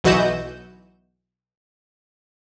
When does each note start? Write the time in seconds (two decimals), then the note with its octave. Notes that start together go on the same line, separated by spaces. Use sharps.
0.04 B1 E3 F#4 D#5 G6 E7